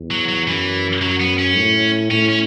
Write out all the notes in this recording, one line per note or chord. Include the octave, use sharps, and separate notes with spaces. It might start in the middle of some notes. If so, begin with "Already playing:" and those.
Already playing: E2
F#3
F#3
F#2 E3
F#2 F#3
B3
C#4
A2
A2 C#4
C#4